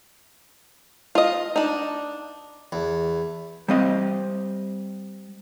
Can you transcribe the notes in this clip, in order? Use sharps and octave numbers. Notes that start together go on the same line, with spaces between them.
F4 D#5
D4 D#4
E2
G3 C4 D#5